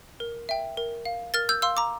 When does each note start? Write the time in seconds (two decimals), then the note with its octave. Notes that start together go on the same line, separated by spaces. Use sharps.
0.20 A#4
0.49 E5 G5
0.77 A#4
1.05 F5
1.34 A#4 F6 A6
1.49 E6 G6
1.62 F5 C6 E6
1.77 A#5 D6